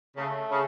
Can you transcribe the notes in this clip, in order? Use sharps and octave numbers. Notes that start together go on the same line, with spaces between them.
C#3 A3
C#3